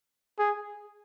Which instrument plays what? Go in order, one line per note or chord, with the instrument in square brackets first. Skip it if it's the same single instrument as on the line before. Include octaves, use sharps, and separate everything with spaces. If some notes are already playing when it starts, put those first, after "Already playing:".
[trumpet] G#4